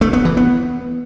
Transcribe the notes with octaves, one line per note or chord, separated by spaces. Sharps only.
A3
B3
E3
B3